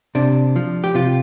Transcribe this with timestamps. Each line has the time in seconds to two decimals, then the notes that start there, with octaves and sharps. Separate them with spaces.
0.15 C3 D4
0.56 F3
0.84 G4
0.95 C3 F4